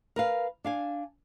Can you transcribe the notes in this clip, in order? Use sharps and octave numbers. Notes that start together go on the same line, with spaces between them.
A#4 B4 F5
D4 F5 G#5